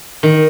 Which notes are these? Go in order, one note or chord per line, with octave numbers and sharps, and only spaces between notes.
D#3